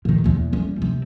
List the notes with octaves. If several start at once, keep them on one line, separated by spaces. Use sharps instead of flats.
A#2 D#3
B1 E2
G3 C#4
C3 C4